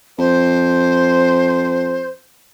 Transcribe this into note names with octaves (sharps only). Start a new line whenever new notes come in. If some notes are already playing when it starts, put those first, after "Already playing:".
F2 C5